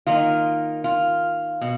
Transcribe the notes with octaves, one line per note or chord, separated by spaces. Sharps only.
D#3 A#3 D#4 F4
F4
B2